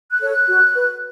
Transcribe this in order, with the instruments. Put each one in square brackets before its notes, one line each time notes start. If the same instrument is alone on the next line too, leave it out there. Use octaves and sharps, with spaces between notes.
[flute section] F#6
A4 C#5
F#6
F#4
B4